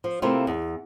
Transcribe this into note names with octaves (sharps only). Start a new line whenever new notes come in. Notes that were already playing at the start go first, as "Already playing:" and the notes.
F3
C3 A3 A#3 C4 E4 F4
E2